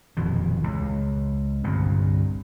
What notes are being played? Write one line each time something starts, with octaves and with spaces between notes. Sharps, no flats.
D#1 F2 B2 E3
C#2
G1 C2 A#2